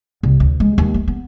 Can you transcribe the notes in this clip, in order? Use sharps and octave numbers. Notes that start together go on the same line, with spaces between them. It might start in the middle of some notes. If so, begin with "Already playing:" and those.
C2
D2
G#3
D#2
A3
B3